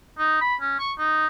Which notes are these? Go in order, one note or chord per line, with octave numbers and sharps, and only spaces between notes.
D#4
B5
C#4
C#6
D#4